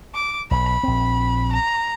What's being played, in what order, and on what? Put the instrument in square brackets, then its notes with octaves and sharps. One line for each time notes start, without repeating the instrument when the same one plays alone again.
[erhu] D6
[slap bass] B1 [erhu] B5
[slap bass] A#1 C4
[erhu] A#5